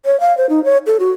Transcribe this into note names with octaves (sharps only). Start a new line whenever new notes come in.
C#5
F5
C5
D#4
C#5
A4
F#4